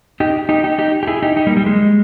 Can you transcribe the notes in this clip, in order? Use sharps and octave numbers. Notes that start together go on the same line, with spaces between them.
D#4 G4
D#4 G4
D#4 G4
D#4 G4
G4
E4 G#4
D#4 G4
D#4 G4
G3 A#3
G3
G#3